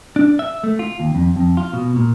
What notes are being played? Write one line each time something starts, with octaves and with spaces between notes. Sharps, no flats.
D4
E5
A3
F4
D#2
F2
F2
F4
B2
A#2